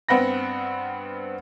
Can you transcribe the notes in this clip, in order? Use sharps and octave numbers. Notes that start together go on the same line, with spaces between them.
G2 B3 C4 F#5 B5 A#6